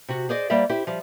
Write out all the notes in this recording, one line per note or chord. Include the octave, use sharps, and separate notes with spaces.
C3 F#4
G#4 C5 D5 D#5
G3 A#3 C5 D5 E5
E4 G4 C5
F3 G3